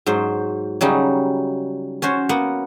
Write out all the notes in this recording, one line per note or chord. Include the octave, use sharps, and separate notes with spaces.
G#2 F#3 C5
C#3 F#3 G3 D#4
C#4 F#4 C5 C#5
A#3 B3 F#5